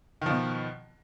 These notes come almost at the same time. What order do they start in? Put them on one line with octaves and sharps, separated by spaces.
D#3 F3 B2